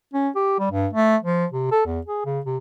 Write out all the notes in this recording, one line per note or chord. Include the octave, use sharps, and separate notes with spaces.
C#4
G4
G3
G2
A3
F3
C3
A4
E2
G#4
C#3
C3